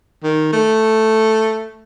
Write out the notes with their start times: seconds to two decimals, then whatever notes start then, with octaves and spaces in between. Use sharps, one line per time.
0.24 D#3
0.53 A3